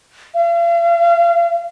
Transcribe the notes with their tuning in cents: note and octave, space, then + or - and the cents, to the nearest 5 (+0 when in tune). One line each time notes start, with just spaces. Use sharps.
F5 -45